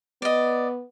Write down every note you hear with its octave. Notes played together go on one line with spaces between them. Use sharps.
B3 D5 D#5